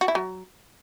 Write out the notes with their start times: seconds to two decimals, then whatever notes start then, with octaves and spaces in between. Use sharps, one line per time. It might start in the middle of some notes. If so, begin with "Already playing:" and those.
0.01 F#4
0.08 E4
0.15 F#3